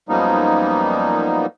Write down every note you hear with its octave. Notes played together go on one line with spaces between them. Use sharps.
F#2 F3 G3 A#3 B3 D#4